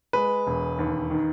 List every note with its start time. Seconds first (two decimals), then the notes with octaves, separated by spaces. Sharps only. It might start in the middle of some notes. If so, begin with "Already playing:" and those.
0.13 G#3 B4
0.47 E1
0.79 D#2
1.11 D#3